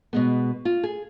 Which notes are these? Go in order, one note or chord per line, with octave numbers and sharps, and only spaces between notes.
B2 G#3 B3
F4
G#4